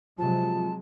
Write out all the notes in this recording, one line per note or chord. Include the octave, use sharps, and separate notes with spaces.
C3 F3 F#3 G#3 A5